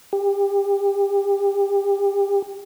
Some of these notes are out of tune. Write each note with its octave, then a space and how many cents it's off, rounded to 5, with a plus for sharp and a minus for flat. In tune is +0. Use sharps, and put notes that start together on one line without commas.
G4 +30